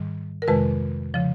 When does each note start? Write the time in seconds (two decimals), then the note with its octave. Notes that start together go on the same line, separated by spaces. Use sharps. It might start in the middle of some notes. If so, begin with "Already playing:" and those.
Already playing: G#2 D#3 G3
0.42 A#4
0.48 F2 C3 D#3 G#3 B4
1.14 C#3 F3